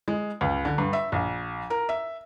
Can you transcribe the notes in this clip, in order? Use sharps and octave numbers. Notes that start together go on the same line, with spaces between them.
G#3
C#2
D3
G2
E5
A#1
A#4
E5